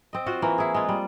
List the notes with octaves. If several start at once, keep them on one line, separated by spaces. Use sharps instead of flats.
C4 D#5
F4 F#4 C5
E3 A#3
E4 G#4
G#3 F4
G3